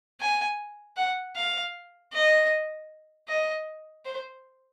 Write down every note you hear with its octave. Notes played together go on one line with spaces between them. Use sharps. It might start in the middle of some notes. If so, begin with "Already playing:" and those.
G#5
F#5
F5
D#5
D#5
C5